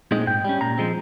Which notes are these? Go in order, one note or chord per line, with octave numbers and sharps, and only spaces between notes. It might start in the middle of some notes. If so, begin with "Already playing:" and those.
A#2 G#3 C4 D#4
G#2 G5
G3 C#4
A#2 A#5
F3 G#3 C4